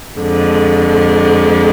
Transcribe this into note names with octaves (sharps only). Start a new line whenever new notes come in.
F2 D3 G#3